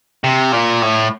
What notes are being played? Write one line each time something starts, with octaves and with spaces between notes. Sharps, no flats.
C3
A#2
A2